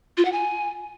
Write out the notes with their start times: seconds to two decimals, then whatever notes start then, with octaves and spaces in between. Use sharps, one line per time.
0.17 F4
0.25 F#5
0.32 G#5